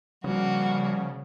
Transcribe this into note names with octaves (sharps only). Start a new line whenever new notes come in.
C#3 F3 G3 A#3 F#4